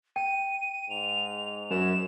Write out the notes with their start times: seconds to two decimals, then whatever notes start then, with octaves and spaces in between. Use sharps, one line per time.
0.16 G5 D#7
0.90 G#2 F7
1.71 F#2 E7